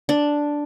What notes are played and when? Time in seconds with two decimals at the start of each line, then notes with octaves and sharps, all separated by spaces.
0.09 D4